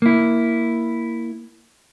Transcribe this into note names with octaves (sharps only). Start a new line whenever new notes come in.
A#3 E4